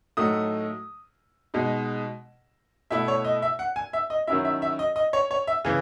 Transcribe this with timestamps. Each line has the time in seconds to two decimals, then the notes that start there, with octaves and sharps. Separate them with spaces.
0.17 A2 F#3 A3 D#4 D#6
1.54 B2 G#3 D#4
2.90 B2 A3 E4 E5
3.08 C#5
3.25 D#5
3.42 E5
3.59 F#5
3.76 G#5
3.93 E5
4.10 D#5
4.27 D#3 F#3 C#4 E4 E5
4.45 E5
4.62 E5
4.79 D#5
4.96 D#5
5.13 C#5
5.31 C#5
5.47 E5
5.65 C#3 E3 G#5